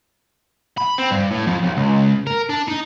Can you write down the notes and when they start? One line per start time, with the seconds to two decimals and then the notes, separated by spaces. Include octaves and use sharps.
0.78 B5
0.98 C4
1.11 G2
1.31 A2
1.47 F2
1.63 B1
1.77 C#2
2.27 A#4
2.50 D4
2.68 D#4